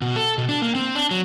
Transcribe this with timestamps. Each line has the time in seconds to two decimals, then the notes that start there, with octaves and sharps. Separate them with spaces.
0.02 B2
0.16 A4
0.38 B2
0.49 D4
0.62 A#3
0.75 C4
0.95 D4
1.11 F#3